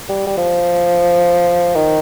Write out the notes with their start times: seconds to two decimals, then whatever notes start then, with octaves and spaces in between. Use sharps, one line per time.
0.09 G3
0.27 G3
0.37 F3
1.76 D#3